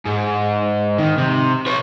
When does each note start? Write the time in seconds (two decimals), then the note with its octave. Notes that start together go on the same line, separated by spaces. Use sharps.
0.05 G#2
0.98 D#3
1.18 C3
1.66 B4 C#5